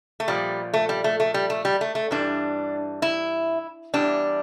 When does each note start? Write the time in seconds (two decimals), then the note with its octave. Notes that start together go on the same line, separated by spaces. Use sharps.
0.20 A3
0.28 A#2 F3 G3
0.74 A3
0.89 G3
1.04 A3
1.20 A3
1.34 G3
1.50 A3
1.65 G3
1.81 A3
1.95 A3
2.11 G2 E3 G3 D4
3.02 E4
3.94 E2 E3 G3 D4